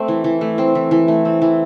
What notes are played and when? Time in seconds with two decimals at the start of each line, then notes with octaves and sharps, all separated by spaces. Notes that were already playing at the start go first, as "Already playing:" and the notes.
Already playing: A3 C4
0.08 E3
0.24 E3
0.41 A3
0.58 C4
0.75 E3
0.91 E3
1.08 A3
1.25 C4
1.42 E3